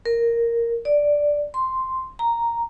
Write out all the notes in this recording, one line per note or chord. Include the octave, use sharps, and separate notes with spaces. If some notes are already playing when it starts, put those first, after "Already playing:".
A#4
D5
C6
A#5